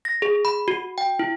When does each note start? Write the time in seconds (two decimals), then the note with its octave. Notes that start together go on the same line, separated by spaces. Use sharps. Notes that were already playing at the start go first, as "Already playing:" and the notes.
0.05 A#6
0.22 G#4
0.45 B5
0.68 F#4
0.98 G5
1.19 E4